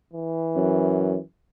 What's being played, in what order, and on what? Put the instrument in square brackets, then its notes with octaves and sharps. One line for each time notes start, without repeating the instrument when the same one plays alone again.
[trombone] E3
[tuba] F#2